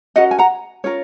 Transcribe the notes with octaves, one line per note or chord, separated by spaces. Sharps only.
C#4 F#4 A#4 D#5 F#5
G#5
F#5 A#5
C#4 F4 A#4 C#5